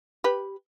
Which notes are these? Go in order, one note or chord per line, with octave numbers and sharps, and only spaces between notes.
G4 B4